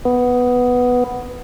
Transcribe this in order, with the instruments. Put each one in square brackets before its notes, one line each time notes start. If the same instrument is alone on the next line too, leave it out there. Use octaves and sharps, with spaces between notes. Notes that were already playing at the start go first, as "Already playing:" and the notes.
[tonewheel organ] B3